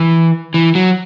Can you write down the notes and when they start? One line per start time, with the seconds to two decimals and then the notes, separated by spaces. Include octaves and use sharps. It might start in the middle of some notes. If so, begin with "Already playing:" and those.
Already playing: E3
0.54 E3
0.75 F#3